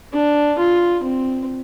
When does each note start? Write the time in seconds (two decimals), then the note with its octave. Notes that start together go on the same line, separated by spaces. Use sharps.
0.13 D4
0.58 F4
1.03 C4